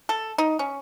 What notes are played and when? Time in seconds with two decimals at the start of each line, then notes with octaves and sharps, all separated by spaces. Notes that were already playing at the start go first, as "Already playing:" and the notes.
0.09 A4
0.38 D#4
0.59 C#4